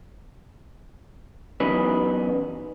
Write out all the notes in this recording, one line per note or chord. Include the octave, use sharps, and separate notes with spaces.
E3 F#3 B3 C#4 D#4 B4